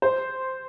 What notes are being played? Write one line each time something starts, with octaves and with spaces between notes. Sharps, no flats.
C5